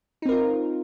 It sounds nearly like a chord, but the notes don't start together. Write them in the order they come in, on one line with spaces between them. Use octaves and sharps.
D#4 C4 A#4 F4